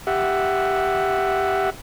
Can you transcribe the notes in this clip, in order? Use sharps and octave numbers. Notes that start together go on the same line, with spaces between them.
G4 E5 F#5